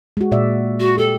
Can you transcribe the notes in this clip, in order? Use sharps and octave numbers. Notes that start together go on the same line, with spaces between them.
G#3 F#4
A#2 D5 E5
F#4
G4 A4